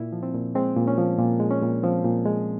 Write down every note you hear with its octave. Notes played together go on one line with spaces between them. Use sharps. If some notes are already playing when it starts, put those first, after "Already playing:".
Already playing: A#2 E4
F3
C4
A#2
G#3 C4
A#2
C#4
F3
A#2
G#3
C#4
A#2
F3 C4
A#2
G#3